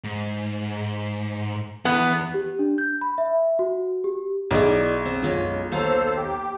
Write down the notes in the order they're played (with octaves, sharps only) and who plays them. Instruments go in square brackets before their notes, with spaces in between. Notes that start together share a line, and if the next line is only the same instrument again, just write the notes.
[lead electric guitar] G#2
[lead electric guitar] E2 E3 [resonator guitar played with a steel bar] B3
[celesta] G4
D4
G6
B5
E5
F#4
G4
[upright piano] B1 [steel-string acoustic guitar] E4 D5 [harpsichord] G#4 D#5 D6
[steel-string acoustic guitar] C4
F#2 G#3 F4
[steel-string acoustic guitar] D#2 F5 A#5 [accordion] A4 C5
[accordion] G4